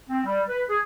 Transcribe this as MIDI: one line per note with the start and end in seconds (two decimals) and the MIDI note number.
0.10 0.21 60
0.25 0.42 55
0.49 0.63 71
0.69 0.78 68